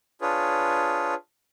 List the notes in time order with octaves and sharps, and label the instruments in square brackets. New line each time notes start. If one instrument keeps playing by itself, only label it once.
[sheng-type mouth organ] D4 F4 G#4 B4 C#5